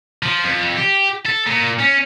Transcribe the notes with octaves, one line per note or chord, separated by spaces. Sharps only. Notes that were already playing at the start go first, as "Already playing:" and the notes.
F3
F2
G4
A4
A#2
C#4